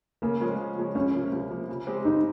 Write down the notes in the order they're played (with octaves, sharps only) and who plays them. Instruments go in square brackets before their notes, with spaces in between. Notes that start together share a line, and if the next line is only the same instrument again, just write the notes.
[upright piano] C#3 [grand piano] A#3
[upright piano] F3 G#3 C#4
C#3
F3 G#3 C#4
[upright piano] C#2 [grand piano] C#4
[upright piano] C3 F3 A#3
C#2
C3 F3 A#3
C#3
G#3 C4 G4
[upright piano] C#3 [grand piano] D#4